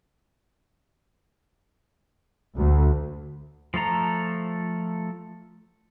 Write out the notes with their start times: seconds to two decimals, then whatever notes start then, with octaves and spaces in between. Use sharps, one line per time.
2.56 D2
3.74 F3 A3 A4 A#5